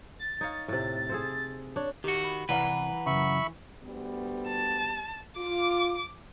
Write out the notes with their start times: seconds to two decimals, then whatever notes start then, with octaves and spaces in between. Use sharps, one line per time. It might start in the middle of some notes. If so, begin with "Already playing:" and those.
0.19 A6
0.41 D#4 C#5 F5
0.68 A2 C3
1.09 G#4 A4 C5
1.76 D4 C#5
2.04 D#3 F#4 G4
2.24 B5
2.49 C2 E3 B4 D5 F5 F#5 A#5
3.06 F#2 C#3 E5 B5 C#6
3.81 D2 G3 B3
4.48 A5
5.38 F4 D6